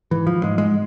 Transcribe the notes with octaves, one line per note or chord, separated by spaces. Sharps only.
G#2 E3
F3
G#2 G#3
G#3